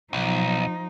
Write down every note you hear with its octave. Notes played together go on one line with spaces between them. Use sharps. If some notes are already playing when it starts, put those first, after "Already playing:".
B1 F3 D#4